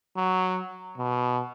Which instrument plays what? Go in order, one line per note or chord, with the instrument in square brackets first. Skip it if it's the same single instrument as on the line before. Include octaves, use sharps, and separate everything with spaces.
[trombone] F#3
B2